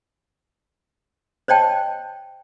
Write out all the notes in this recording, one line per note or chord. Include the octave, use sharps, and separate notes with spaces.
C5 C#5 D#5 G5 A5